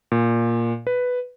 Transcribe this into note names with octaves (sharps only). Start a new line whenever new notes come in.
A#2
B4